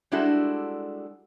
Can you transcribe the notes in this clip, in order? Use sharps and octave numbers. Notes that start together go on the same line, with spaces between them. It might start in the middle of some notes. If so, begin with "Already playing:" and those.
G3 G#3 D4 E4 F#4 A4